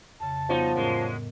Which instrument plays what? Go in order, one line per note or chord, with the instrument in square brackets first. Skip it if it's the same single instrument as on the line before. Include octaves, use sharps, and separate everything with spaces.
[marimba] F2 C#3 [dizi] A5
[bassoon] F3 [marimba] G3 B3 [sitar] D#4 F#4 C#5
[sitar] F#2 G#3 [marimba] A2 A#4 D#5